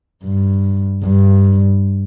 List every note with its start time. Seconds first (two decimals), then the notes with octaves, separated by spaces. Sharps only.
0.24 G2
1.04 G2